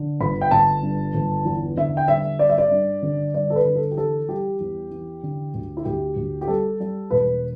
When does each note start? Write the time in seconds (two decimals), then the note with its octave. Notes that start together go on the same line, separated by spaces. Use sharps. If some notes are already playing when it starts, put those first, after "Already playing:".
Already playing: D3
0.21 G1 B5
0.41 G5
0.51 G1 A5
0.82 G2
1.14 G1
1.45 E2
1.77 D3 E5
1.97 G5
2.08 G3 E5
2.39 G3 D5
2.49 E5
2.58 D5
2.71 G2
3.02 D3
3.34 G2 D5
3.50 A4
3.56 B4
3.65 D3
3.75 A4
3.91 G4
3.97 E3 A4
4.28 G3 G4
4.60 E2
4.91 E3
5.23 D3
5.54 D2
5.77 E4
5.85 D2 G4
6.16 D2
6.41 G4
6.48 G3 A4
6.80 G3
7.10 E1 B4